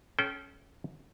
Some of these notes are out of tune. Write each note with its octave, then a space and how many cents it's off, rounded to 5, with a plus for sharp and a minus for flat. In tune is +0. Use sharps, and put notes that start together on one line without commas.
C#4 +0 A4 -40 G5 -20